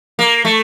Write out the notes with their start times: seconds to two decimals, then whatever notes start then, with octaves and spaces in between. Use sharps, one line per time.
0.19 A#3
0.45 A3